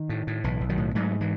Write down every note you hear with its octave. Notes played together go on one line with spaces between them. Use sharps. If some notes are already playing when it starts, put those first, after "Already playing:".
Already playing: D#3
A2
A2
B1 E3
B1
D#3 F#3
A2
G#2 F#3 A3
E3 G#3